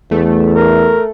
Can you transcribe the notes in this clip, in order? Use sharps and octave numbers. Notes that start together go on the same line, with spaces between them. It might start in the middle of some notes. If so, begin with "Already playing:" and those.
E2 A3
A#4